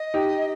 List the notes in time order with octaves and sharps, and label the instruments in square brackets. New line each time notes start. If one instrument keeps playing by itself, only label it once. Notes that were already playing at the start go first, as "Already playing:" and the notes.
Already playing: [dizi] D#5
[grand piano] D#4 G4